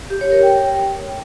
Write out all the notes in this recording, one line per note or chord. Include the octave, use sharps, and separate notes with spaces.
G4
C#5
A#4
G5